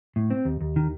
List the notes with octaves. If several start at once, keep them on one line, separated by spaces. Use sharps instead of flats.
A2
C4
D#2
D#2
D#3